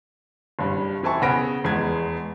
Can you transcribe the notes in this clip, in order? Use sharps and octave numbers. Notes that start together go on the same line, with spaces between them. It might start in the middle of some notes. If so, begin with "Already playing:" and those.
F#1 G2
E3 C4 E4 G#5 A5 C#6
C#3 B3 F#5 B5 A#6 D7
F1 E2 G#3 B3 G#6